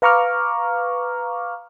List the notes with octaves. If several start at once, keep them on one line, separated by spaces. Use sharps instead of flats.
B4 F5 A#5 C#6 D6 F6